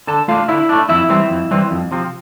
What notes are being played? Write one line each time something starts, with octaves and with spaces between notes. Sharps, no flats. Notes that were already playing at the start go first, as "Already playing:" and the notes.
D3 A4 A5
A3 D4 F4 F5
D3 E4 E5
A3 D4
F2 E4 E5
E3 G3 C4
F2
E3 G3 C4
F2
C3 F3 C4